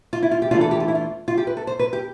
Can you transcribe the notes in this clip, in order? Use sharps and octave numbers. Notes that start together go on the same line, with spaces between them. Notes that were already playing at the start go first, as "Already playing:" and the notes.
F4
E4
F4
G4
E3 A3 D4 F4
A4
G4
F4
E4
F4
F4
G4
B4
A4
C5
B4
G4